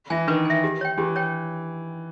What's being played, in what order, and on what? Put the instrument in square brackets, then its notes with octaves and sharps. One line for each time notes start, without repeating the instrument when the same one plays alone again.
[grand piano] E3 [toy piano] E5 G#5
[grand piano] D#3 [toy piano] B4
[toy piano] E5 G#5
G4
C#5 G5
[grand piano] E3 [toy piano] G4
[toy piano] C#5 G5